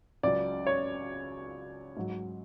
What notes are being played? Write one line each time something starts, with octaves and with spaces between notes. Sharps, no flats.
C#2 C#3 F#3 D5
C#5
G#2 F#3